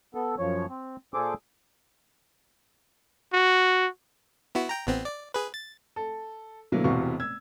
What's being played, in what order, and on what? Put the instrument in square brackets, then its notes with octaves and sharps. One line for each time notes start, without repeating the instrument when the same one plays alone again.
[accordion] B3 A4
F#2 F3 C#5
C4
A#2 G#4 A4 C5 D6
[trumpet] F#4
[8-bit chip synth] B3 E4 F#4
G5 A#5
A1 B3 C4
D5
G#4 B4
A6
[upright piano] A4
B2 D3 F#3 A#3 E4
E1 C3 E3 F#4 F5 C#6
E6 G#6